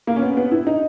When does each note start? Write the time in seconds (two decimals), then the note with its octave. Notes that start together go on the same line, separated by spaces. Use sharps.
0.07 A#3
0.16 C#4
0.22 B3
0.37 B3
0.51 E4
0.67 D#4